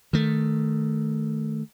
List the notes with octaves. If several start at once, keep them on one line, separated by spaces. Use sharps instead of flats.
D#3 A3